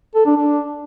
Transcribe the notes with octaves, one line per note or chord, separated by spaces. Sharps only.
A4
D4
D4